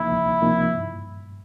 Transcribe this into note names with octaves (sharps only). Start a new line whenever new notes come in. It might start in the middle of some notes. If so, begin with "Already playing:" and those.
Already playing: C#2 C3 F3 A#3 D#4 E4
C#2
C3 F3 A#3 D#4
G2